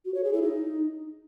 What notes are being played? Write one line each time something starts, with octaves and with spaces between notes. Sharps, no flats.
F#4
C#5
G#4
E4
D#4